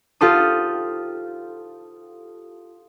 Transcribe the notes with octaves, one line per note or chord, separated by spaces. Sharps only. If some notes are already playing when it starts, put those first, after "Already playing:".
F4 G4 A4 C5 D#6